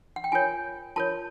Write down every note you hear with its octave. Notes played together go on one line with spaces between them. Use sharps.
F#5
G5
F4 A#4 C#5 G#5
F4 A#4 C#5 A5